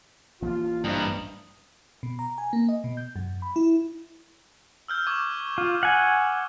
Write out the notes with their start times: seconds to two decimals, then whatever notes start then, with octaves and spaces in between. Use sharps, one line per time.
0.42 A1 F3 A#3 F4
0.84 G2 C3 E3 G3 A#4 D#5
2.03 B2
2.19 A#5
2.38 G#5
2.53 A#3
2.69 D#5
2.84 B2
2.97 G6
3.16 F#2
3.42 B5
3.56 E4
4.88 E6 F6 G6
5.07 C#6 D6 G#6
5.58 F4
5.83 F#5 G#5